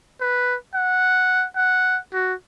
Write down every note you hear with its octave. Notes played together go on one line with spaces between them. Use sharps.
B4
F#5
F#5
F#4